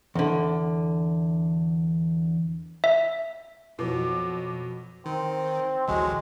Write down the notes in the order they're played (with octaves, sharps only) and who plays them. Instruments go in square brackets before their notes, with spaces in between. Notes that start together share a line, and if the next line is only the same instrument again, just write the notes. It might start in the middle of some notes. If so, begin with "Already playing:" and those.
[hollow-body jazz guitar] E2 D3
[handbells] E5
[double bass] F2 F#3 [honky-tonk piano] B2 [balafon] E4 F4 B4 [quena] D6
[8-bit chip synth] D#3 [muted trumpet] C4
[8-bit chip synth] A1 D2 F#3 [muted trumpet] G#3